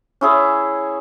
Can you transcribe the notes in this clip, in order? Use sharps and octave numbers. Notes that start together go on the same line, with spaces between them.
C#4 E4 G#4